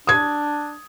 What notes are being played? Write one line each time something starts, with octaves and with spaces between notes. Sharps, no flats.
D4 D#6 G#6